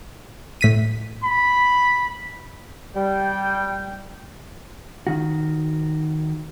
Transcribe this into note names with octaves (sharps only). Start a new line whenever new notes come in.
A2 B6 D#7
B5
G3 G5
D#3 F#4